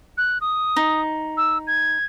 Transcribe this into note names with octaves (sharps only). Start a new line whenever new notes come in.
F#6
D#6
D#4
E6
G#6